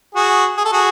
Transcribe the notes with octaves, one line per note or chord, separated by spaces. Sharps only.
F#4 G#4
G#4
A4
F#4 G#4